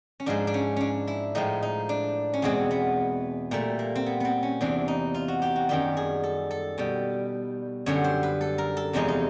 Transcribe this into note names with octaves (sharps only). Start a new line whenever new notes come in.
C#4
G#2 F3 G#3 D4
D4
C#4
C#4 D4
E4
A2 F3 G#3 D#4
D#4
D4
C#4
E2 B2 G#3 C4
B3
A#2 G3 A3
A#3
C4
B3
B3 C4
C#4
E2 C3 E3 D4
D#4
F4
F#4
G4
F#4
F#2 D#3 G3 G4
G#4
A4
A4
B2 G3
F#2 D3 G3 C#5
C5
B4
A4
A#4
A4
E2 C3 F3 G#3 D#4
D#4